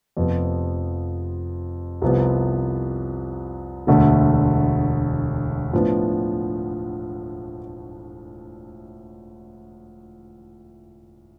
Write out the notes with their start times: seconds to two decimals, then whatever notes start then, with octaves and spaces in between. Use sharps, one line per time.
0.17 F1 F2 C3 F3 B3
2.02 C2 C3 F3 B3
3.87 E1 D2 D3 A3
5.73 A2 F3 B3 D4